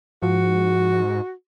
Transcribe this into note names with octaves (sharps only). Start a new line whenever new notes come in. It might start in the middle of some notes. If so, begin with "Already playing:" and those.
G#2 F3 F#4